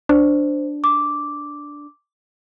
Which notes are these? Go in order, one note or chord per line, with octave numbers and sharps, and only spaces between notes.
D4 C5
D6